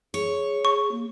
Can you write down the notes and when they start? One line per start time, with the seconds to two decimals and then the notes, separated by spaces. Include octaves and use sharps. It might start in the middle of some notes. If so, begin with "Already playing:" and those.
0.14 G#4 C#5
0.65 C#6
0.91 A#3